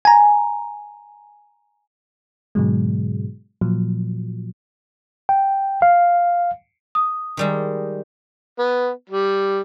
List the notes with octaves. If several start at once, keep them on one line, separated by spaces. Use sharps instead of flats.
G#5 A#5
G#2 B2 D3 F#3 G#3
A#2 F3 F#3
G5
F5
D#6
D#3 G3 G#3
B3
G3